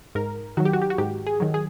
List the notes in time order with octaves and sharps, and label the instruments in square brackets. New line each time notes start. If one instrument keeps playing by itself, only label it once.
[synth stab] G#2 A#4
D#3 F#3 F#4
G4
F#4
G4
F#4
G#2 G4
G#4
D#3 F#3
G#4